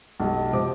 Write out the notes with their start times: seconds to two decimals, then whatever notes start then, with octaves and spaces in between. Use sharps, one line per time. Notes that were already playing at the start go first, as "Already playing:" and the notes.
0.20 B1 B2 G3
0.53 C3 F3 C4 D6